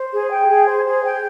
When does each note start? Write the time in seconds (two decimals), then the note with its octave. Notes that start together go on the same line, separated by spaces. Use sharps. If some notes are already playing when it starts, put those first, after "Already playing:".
Already playing: C5
0.11 G#4
0.30 G5
0.48 G#4
0.67 C5
0.85 G#4
1.04 G5